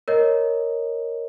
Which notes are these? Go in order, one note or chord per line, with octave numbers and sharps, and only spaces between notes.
A#4 C#5 D#5